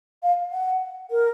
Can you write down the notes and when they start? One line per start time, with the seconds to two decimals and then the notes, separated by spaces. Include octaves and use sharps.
0.23 F5
0.52 F#5
1.11 A#4